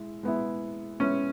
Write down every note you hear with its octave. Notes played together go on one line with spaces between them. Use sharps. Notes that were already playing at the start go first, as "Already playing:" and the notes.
Already playing: G#3 E4
G#3 B3 E4
G#3 B3 C#4 E4